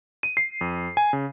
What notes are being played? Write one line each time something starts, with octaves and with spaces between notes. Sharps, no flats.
D#7
C7
F2
G#5
C#3